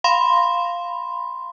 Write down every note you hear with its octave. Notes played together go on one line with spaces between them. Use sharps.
F5 B5 C6